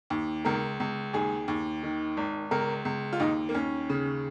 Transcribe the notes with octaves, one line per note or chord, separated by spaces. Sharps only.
D#2
C#2 A#4
C#2
D#2 G#4
D#2
D#3
G#1
C#2 A#4
C#2
F4
D#2 D#4
A#3
D#2 C#4
C#3